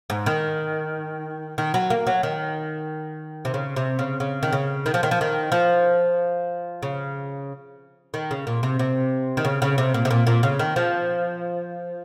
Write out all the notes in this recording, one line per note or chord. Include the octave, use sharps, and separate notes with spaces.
G#2
D#3
D#3
F#3
A#3
F#3
D#3
C3
C#3
C3
C#3
C#3
D#3
C#3
D#3
F3
D#3
F3
D#3
F3
C#3
D#3
C#3
A#2
C3
C3
D#3
C#3
C#3
C3
A#2
C3
A#2
A#2
C#3
D#3
F3